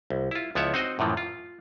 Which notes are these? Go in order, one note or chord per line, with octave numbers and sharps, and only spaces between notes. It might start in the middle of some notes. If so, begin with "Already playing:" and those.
C2
E4 F4
C#2 F3 B3 E4 C#5 E5
C4 D#4 F#4 C5 D#5
F#2 A2 E3 F3
F4